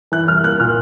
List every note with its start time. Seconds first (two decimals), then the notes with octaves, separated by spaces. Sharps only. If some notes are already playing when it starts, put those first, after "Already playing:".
0.12 E3 F#6
0.28 C2 F6
0.44 A#3 F#6
0.60 A#2 F6